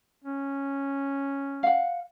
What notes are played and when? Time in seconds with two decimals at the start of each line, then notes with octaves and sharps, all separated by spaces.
0.24 C#4
1.63 F5 F#5